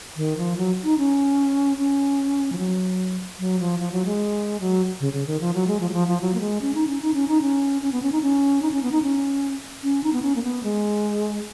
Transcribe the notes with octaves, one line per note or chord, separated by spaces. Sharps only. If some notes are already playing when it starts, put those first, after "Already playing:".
D#3
F3
F#3
D#4
C#4
C#4
F3
F#3
F#3
F3
F3
F#3
G#3
F#3
C#3
C#3
D#3
F3
F#3
G#3
F3
F#3
F3
F3
F#3
A#3
G#3
C#4
D#4
C#4
D#4
C#4
D#4
C#4
C#4
B3
C#4
D#4
C#4
D#4
C#4
B3
D#4
C#4
C#4
D#4
B3
C#4
A#3
B3
G#3